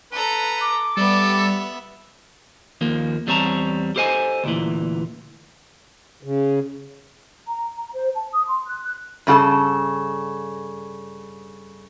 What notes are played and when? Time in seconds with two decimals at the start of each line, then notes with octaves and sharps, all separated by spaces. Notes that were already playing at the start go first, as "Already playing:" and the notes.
0.12 A4 B4 A#5
0.61 D6
0.97 G3 B3 A4 E5
2.81 D#2 F3 A#3
3.27 E2 G3 C4 C#5 A5 A#5
3.96 G4 A4 C5 D#5 G#5
4.44 D2 A#2 E3
6.23 C#3
7.46 A#5
7.77 A#5
7.93 C5
8.15 A5
8.32 D#6
8.47 C6
8.66 F#6
8.84 F#6
9.27 G2 C#3 F#4 A4 A5